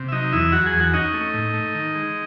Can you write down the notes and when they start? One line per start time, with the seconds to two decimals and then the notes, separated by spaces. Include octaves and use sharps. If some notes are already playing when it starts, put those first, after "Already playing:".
Already playing: C3
0.08 E5
0.12 F#3 D#4 D#5
0.32 E2 E4 E5
0.52 F#3 F#4 F#5
0.66 G#4 G#5
0.73 E2
0.80 F#4 F#5
0.94 C#4 D#4 D#5
1.14 A3
1.34 A2
1.54 A3
1.74 D#3
1.95 G#3